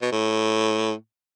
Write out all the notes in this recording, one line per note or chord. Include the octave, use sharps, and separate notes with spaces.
B2
A2